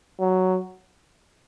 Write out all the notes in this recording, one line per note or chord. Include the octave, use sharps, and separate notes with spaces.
F#3